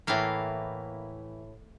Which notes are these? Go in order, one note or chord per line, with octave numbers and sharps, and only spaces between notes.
A2 E3 A#3 F5